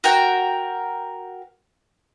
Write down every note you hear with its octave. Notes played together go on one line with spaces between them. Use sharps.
F#4 A#4 G5